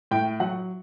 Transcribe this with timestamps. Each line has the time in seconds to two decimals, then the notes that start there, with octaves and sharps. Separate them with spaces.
0.11 A2 G5
0.40 F#3 F#5